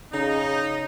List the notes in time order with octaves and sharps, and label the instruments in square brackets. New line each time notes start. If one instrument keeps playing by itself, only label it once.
[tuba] C#3 [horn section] D#4